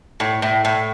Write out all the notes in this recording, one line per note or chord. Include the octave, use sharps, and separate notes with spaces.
A2
A2
A2